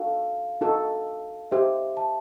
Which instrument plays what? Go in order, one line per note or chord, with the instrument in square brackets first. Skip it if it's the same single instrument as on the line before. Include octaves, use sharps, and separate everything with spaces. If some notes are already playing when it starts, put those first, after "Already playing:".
Already playing: [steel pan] D#4 F#4 A4 [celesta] F5
[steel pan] D#4 F#4 A4
[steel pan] D#4 G4 C5 [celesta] E5
[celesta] A5